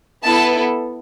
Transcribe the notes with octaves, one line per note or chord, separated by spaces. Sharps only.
B3 E4 A4 A5